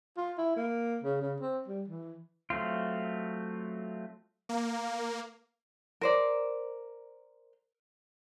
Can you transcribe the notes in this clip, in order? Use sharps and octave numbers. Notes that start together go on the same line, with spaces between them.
F4
E4
A#3
C#3
C#3
C4
G3
E3
F#3 A3 C4 F4
A#3
A#4 C5 D5